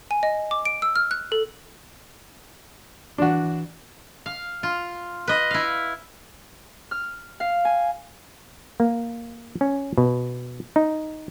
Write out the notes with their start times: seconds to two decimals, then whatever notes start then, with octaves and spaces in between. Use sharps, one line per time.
0.11 G#5
0.23 D#5
0.51 D6
0.65 D7
0.82 E6
0.96 F6
1.11 F#6
1.32 A4
3.18 E3 D4 F#4
4.26 F5
4.63 F4
5.28 B4 D#5
5.51 E4 F5
6.91 F6
7.40 F5
7.65 G#5
8.80 A#3
9.61 C#4
9.98 B2
10.76 D#4